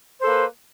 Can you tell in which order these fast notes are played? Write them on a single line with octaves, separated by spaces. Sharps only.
C5 A4 A#3 B4